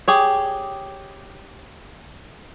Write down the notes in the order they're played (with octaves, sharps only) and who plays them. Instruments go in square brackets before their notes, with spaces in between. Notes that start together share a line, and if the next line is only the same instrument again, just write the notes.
[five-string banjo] G4 G#4 C#5